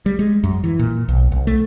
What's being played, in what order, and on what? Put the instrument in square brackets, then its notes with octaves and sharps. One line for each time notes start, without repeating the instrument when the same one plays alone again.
[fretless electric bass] G3
G#3
F#2
E3
A#2
B1
C2
A3